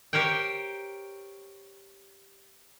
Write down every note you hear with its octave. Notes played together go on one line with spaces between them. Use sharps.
G4 A#4 C5 C#5 G5